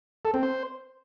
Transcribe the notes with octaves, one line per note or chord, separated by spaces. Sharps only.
A4
C4
C5